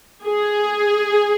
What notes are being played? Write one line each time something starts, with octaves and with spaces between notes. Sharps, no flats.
G#4